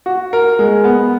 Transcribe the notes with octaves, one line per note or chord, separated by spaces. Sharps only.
F#4
A#4
G#3
B3